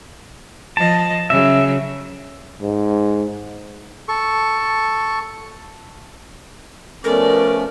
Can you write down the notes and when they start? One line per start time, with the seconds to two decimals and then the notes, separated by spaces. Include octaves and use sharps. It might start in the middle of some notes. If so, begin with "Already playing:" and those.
0.77 F3 D#5 A5
1.30 C#3 F#3 E5
2.62 G#2
4.08 A4 C#6
7.04 F3 A3 B3 C#4 A4 A#4 D5